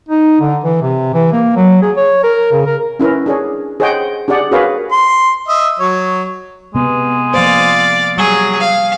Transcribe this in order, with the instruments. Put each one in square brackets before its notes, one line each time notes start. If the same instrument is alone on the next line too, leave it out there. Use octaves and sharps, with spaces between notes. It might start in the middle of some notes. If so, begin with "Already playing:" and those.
[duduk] D#4
D3
E3
C3
E3
A#3
F#3
G#4
C#5
A#4
C#3
A#4
[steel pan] C#4 E4 A#4 B4
D4 G#4 C#5
G#4 C5 C#5 D#5 F#5 G5
D4 G4 G#4 D5 F#5
F#4 G#4 A#4 B4 C#5 F5
[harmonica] C6
D#5 E5
F#3 C#5
[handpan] C3 B3 [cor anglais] G#3
[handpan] F3 A#3 C5 [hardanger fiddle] D5 F5
[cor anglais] F#3 [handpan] G3 [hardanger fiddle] G#4
[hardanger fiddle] F5